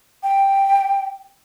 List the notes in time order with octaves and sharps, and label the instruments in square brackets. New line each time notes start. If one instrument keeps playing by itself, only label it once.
[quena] G5